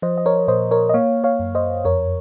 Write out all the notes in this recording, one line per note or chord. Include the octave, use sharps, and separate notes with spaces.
F3 C5 D#5
D#5
A#4 C#5
A#2 C5 D#5
A#4 C#5
D#5
A#3 C#5 F5
C#5 F5
F#2
C5 D#5
F2 A#4 C#5